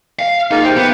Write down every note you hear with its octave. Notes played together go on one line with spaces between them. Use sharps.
F5
G#3 A#3 D#4 F4
C3 G5
B3